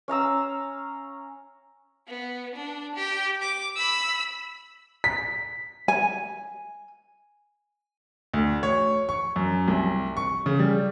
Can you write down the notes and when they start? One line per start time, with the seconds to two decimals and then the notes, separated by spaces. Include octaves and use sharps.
0.08 C#4 F5 A#5 E6
2.08 B3
2.56 D4
2.96 G4
3.41 D6
3.76 B5 E6
5.04 B6
5.88 G#5
8.33 D2
8.63 C#5
9.09 C#6
9.36 F#2
9.68 C2
10.17 C#6
10.46 C#3
10.59 G3